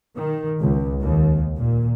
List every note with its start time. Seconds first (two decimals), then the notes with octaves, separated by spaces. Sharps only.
0.16 D#3
0.60 C#2
1.01 D#2
1.58 A#2